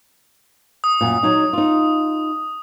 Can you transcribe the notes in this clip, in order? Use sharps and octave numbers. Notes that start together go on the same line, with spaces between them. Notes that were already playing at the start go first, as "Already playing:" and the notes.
D#6
F#2 A#2
F#3 D#4
D#4 F4